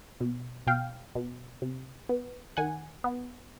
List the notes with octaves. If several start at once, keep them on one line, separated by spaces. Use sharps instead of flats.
B2
B2 F5 G5
B2
C3
B3
D#3 F#5 G#5
B3